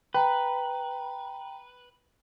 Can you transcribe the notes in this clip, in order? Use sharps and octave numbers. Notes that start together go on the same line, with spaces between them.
B4 G5 A#5